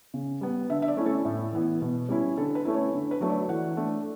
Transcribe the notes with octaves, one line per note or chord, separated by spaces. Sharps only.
C#3
G3 B3
D3 E5
E5
D5
A3 C#4 E4
A4
A2
E3 B3 E4
B2
G3 C#4 E4
D3 A4
B4
A3 C#4 E4
C#5
D3
B4
F#3 A3 D4
D5
E3 F#5
A3 D4